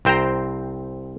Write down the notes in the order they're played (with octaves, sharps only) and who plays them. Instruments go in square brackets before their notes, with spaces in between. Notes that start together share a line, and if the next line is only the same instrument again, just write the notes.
[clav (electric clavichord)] C2 C4 C5 G5 A#5